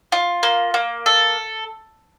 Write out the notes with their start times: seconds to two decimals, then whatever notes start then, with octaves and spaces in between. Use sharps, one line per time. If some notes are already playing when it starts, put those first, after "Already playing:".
0.12 F4
0.43 A#3
0.74 A#3
1.06 A4